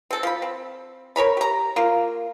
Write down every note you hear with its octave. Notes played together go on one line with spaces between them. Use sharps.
C4 A4
F3 B5
C4
A#4 C#5 A#5 B5
G4 A#5
A#3 F4